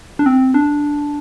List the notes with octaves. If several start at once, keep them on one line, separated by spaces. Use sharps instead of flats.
D4
C4
D4